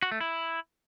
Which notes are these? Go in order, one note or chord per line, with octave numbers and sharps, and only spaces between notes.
F#4
A3
E4